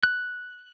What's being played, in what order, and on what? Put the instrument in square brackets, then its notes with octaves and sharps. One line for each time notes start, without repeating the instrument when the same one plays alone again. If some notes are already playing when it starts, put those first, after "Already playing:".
[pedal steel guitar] F#6